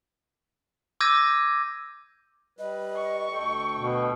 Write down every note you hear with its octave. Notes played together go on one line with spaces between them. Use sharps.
D6 E6 G6 G#6 A#6 D#7
G3 B4 D#5
C#6
D2 A4 G5
B2